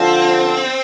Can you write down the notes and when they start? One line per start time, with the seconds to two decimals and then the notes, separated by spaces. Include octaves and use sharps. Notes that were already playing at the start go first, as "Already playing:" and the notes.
Already playing: D3 F3 C4